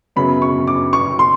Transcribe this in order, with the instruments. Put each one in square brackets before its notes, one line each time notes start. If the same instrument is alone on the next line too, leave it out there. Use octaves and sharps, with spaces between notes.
[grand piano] F#2 C#3 F#3 B3 [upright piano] B5
[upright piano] C#6
D6
C#6
C6